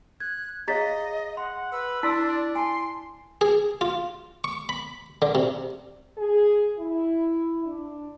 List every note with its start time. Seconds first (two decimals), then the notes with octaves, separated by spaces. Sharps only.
0.20 F#6 G#6
0.68 G#4 C#5 D#5 F5 A#5 A6 B6
1.37 F#5 C6
1.72 B4 E6
2.03 D4 E4 D5 A5 C6 E6 B6
2.55 G#5 A5 C6
3.41 G#4
3.81 F4
4.44 C#6
4.69 B5
5.22 D3
5.35 C3
6.17 G#4
6.77 E4
7.66 D4